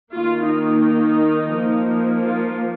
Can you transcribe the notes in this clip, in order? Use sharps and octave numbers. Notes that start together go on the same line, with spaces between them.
D#3 A#3 F4
D#4
F3 A#3
F4